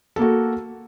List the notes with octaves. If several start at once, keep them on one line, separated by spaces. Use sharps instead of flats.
A#3 F#4 A4